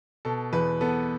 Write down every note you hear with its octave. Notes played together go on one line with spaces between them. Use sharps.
B2 A4
E2 B4
B3 A4